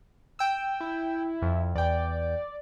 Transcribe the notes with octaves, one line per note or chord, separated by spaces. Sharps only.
G5 E6
E4
F2
E2 D5 G5